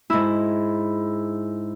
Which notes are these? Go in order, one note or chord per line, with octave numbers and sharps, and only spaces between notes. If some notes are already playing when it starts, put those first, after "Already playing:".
G#2 E4